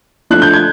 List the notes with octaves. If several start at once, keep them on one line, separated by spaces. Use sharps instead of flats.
F3 A3 D4 F#6
G6
G#6